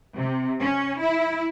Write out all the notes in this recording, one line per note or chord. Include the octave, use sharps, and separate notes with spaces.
C3
C#4
E4